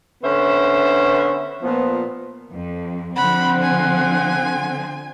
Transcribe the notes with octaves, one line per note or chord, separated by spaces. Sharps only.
D3 B3 C#4 C5 E5
A#2 F3 B3
F2
D3 F3 C4 F#5 B5
G#5